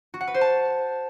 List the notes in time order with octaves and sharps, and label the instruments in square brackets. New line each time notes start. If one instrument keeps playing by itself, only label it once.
[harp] F#4
F#5
B4
C5
A5